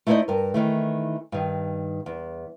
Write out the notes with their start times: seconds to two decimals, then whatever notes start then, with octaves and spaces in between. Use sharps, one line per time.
0.07 A3 D#4 E4 C5 D5 D#5
0.28 G2 A#4
0.54 D#3 E3 A3
1.32 G2 D#3
2.06 E2